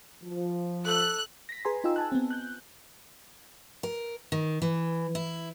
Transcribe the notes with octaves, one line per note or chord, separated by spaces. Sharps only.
F3
A4 F#6
A#6 B6
G#4 B4 G#5 A#5 C6
D#4 F4 D#5 G5 E6
G#5 A5 F#6
B3 C4
F#6 G6
A#4
D#3
E3
E4